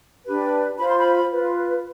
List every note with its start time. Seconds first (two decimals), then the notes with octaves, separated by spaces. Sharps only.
0.24 D4 G4 B4
0.78 F4 C5 B5
0.88 C6
0.99 B5
1.31 F4 B4